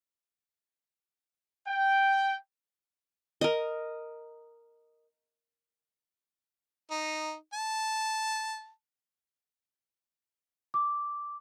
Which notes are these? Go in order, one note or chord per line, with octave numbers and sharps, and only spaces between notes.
G5
A#4 D#5
D#4
A5
D6